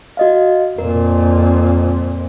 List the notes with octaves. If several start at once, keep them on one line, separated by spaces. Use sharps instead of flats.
F#4 D#5 F5
F2 A#2 A#4